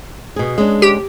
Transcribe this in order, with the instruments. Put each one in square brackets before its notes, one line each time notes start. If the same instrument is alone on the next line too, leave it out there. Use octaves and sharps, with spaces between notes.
[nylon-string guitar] B2 G#4
G#3 C#4 D4
[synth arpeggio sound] G4